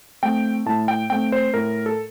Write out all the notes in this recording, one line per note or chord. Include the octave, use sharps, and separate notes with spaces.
A3 C4 G5
A2 A5
G5
A3 C4 G5
C5
A2 A#4
A4